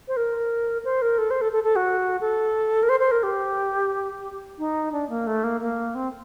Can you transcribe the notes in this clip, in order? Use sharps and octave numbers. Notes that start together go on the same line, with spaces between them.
C5
A#4
C5
A#4
A4
C5
A4
A4
A4
F#4
A4
A#4
C5
C5
A#4
G4
D#4
D4
A#3
A3
A#3
A#3
C4